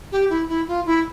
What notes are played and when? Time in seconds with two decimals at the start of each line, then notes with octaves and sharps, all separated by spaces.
0.12 G4
0.30 E4
0.49 E4
0.68 F4
0.86 E4